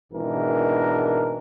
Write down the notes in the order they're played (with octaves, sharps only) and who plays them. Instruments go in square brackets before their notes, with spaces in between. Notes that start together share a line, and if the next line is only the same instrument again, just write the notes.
[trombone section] G#1 G#2 B2 E3 D4 A#4